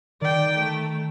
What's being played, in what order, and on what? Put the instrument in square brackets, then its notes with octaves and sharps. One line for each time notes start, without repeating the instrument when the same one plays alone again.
[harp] D#3 [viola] D5 G5
[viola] A3